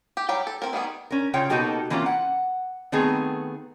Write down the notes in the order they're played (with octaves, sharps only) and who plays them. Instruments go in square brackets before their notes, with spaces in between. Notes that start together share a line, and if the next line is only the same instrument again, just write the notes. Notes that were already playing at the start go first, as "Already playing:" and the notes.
[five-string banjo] G4
F#3 G3 G4 G5
A4
C4 A#4
D#3 G3 B3 G#4
[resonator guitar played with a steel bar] C#4 A#4
C#3 F4 C#5 G5
B2 A#3 D#4 F#4 G4 A4
E3 A#3 C4 C#4 F4
F#5
D#3 A3 B3 C4 G#4 A#5